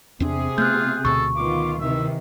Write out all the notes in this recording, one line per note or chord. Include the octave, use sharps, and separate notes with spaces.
E2 C3 C4 D4 G#4
A3 B3 F4 F#6 G6
D2 B2 A4 C#6
D#3 B3 F4 D6
C3 D#3 E3 E5